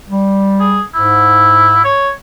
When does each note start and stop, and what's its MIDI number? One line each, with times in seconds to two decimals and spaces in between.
0.09 0.80 55
0.60 0.82 68
0.95 1.94 44
0.95 1.84 64
1.85 2.10 73